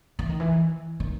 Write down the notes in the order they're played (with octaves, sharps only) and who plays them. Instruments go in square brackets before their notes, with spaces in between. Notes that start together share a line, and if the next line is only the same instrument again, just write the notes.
[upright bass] E3
D#3
E3
D#3